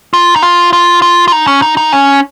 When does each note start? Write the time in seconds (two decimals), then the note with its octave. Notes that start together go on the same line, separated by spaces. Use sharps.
0.14 F4
0.36 D#4
0.42 F4
0.73 F4
1.02 F4
1.28 F4
1.32 D#4
1.47 C#4
1.62 D#4
1.77 D#4
1.92 C#4